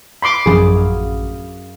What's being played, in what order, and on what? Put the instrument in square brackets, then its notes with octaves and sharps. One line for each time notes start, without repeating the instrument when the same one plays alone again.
[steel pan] B5 C6 D6
[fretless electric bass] A1 F3 F#3 [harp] F#2 B5 D6 [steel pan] G#4
[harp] F5 D#6